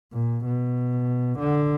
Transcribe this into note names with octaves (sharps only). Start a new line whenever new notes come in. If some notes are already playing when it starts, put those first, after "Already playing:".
A#2
B2
D3